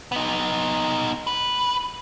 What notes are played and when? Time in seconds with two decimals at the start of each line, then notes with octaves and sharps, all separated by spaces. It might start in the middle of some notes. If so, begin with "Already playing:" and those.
0.12 B3 D#4
1.27 B4